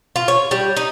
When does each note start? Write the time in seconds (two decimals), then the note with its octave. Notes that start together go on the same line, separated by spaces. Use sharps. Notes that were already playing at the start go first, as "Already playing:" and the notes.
0.16 F4
0.28 C#5
0.51 G3
0.77 D#4